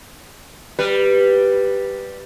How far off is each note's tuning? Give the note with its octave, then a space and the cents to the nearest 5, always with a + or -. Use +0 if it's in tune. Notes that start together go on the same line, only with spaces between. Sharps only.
G3 +0 B4 +0